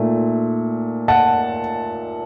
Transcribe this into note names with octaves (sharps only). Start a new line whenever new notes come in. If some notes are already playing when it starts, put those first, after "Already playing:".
Already playing: A#2 A3 D#4
F#5 A5